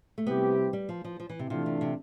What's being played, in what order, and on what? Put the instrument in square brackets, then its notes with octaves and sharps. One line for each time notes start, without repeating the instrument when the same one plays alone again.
[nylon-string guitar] A3
[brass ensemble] C3 G3 C4 E4 G4 [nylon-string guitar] B3
[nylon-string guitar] G3
F3
F3
F3
E3
C3
[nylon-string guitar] C3 [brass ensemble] E3 A3 D4 F4
[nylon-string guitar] C3
C3